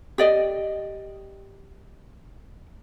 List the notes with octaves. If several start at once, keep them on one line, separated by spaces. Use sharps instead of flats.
G4 D5 D#5